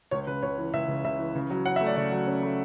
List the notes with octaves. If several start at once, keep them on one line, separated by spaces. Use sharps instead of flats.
C#2 C#5
C#3 B4
C#2 C#5
E3
C#2 E5
C#3
C#2 E5
E3
C#3
F#3
C#4 F#5
E5
A3
D5
C#3 D5
F#3
C#4
A3